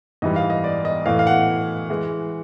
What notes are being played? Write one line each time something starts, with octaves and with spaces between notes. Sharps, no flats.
G#2 E3 G3 D#5
F5
D#5
D5
D#5
A2 E3 A3 F5
F5
F#5
E3 G#3